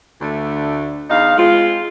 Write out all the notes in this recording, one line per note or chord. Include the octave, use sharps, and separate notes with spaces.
D2 D3 A3 D4
E2 D#4 F5
G#3 C4 F4